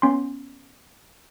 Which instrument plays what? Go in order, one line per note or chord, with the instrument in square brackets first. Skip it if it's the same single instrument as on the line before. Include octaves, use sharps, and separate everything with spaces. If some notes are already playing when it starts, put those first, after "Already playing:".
[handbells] B3 C#4 C6